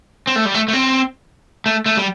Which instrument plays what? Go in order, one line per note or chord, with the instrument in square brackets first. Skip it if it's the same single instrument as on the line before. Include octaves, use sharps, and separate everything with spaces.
[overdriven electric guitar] C4
A3
G3
A3
A3
C4
A3
A3
G3